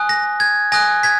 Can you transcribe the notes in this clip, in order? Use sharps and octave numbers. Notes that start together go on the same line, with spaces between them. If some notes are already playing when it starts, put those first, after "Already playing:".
Already playing: G#5 D#6 F#6
A#6
G#6
G#5 D#6 F#6 A#6
G#6 B6